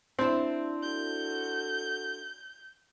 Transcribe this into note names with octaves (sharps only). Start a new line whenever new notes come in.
C4 D4 E4
F#4 A4 G6